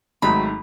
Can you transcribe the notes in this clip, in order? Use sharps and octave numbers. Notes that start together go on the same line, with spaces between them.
G#1 G#2 D#3 F#3 A3 B5